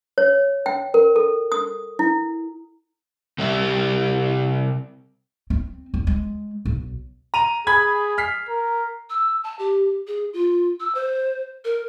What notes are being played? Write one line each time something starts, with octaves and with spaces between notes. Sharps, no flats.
C#5
G5
A#4
A4
D#6
E4
C3 G3 G4 E5
C4
E2
G#3
B1
A#5 D#7 F7
G#4 B5 G#6
F6 B6 C7
A#4
E6
A5
G4
G#4
F4
E6
C5
A#4